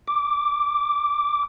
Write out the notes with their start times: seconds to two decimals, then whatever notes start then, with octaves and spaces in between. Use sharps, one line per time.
0.08 D6